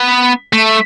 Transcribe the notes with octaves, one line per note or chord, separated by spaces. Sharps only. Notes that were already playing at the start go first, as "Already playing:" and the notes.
Already playing: B3
A3